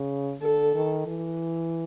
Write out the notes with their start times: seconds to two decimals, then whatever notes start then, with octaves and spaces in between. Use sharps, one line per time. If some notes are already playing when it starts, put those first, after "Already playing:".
Already playing: C#3
0.41 D3 A4
0.74 D#3
1.06 E3